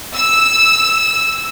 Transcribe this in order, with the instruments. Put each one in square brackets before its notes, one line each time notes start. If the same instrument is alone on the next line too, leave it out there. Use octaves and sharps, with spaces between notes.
[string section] E6